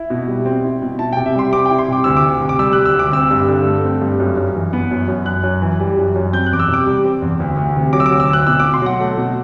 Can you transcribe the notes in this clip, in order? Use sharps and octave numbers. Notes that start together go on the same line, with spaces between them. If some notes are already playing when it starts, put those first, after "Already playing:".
Already playing: E4
B2
G3
C4
E4
B2
E4 A5
G5
C3
E5
G3 C6
C4 D6
G5
E4
C6
C3 D6
D2 E6
D6
D2
C3
D6
G3 E6
F#6
D2
E6
D2 D6
C4 E6
G2
D3
A3
C4
G2
F#2
F#2
E3
B3
F#2
F#2
F#2 F#6
F#2
E3
G3
F#2
F#2
C4 G6
F#6
E2 D6
E6
C3 D6
G3
C4
E2
D2
D2
C3
F#3 D6
E6
D6
D2
E6
D2 F#6
B2 E6
D6
B2
C6
F#3 F#5
A3
B2